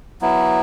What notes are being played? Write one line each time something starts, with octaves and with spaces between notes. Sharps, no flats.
F#3 B3 E4